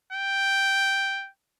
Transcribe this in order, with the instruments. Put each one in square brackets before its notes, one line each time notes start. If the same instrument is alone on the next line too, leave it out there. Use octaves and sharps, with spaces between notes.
[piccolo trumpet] G5